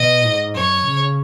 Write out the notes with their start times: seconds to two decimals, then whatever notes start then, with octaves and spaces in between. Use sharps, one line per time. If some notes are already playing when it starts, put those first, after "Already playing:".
Already playing: B2 D#5
0.23 G#2
0.54 F#2 C#5
0.86 C#3